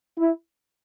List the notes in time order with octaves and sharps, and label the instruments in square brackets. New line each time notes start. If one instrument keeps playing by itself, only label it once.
[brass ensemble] E4